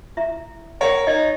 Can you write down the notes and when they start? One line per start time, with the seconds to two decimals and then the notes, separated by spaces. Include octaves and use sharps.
0.17 E4 E5 A#5
0.81 A#4 C#5 F#5 G5 A#5
1.07 D#4 D5 D#5